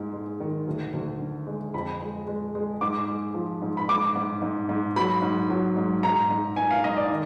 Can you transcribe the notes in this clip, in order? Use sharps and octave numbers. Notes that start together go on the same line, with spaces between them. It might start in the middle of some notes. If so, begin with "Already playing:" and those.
Already playing: G#2 G#3
G#3
D#3
D2
D2
D3
G#3
F2 B5
G#3
G#3
G#3
G#2 D6
G#3
F3
G#2
B5
G#2 D6
G#2
G#2
G#2
F#3 B5
G#2
F#3
G#2
G#2 A#5
G#2
G#2 G#5
F5
G#2 D#5
D5
D#3